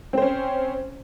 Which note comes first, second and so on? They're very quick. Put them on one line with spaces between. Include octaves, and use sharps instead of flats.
C4 C5 C#4